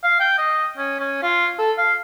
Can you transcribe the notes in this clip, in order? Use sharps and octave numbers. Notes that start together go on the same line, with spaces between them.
F5
G5
D#5
C#4
C#4
F4
A4
F5